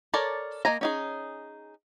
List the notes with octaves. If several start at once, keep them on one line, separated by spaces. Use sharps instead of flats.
A4 A#4 C#5 D5 A5
A#3 D#5 G#5 A#5
C#4 D#4 G#4